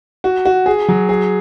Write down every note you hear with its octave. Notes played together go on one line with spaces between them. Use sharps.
F#4
F#4
G#4
F#3
G#4